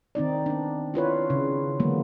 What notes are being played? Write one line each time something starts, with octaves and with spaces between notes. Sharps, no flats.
D#3 C4 D#4 D5
B3 D4
E4 F4 B4 C#5
C#3
D3 E3 F#3 G#3 A#3 B3